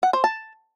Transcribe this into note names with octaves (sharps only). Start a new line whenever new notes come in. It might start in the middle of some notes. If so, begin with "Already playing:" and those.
F#5
C5
A5